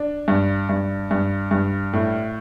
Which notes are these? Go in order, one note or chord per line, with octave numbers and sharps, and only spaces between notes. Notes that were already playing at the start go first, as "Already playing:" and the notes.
Already playing: D4
G2
G2
G2
G2
A2